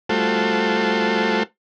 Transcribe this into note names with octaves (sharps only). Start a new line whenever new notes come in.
G3 A3 F4 F#4 A4 C5